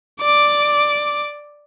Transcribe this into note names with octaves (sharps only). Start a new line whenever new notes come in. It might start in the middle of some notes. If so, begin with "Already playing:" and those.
D5 D6